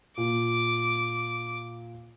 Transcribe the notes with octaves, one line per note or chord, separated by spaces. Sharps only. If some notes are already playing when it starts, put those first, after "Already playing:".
A#2 D6